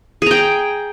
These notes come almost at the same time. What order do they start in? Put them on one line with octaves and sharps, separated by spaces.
G#4 A#5 G5